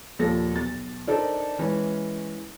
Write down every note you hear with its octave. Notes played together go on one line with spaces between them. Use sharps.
D#2 A#2 F3 A4 A#6
B1 A6
D4 D#4 A4 A#4 C5 D5
E3 G#3 C#4